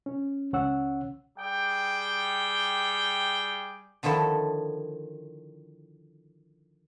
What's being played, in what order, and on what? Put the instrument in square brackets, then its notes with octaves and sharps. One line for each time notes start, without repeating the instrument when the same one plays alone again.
[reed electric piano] C#4
C#2 C#4 C#5 F#5 E6
[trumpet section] G3 G#4 G5 D6
[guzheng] D3 D#3 F3 E4 A4